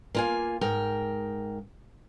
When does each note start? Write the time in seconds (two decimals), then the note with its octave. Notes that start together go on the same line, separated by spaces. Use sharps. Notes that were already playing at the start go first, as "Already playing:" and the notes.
0.15 A#3 F4 G#5
0.61 G#2 A#4 G5